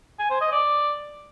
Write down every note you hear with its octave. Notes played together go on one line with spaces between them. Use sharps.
G#5
C5
D#5
D5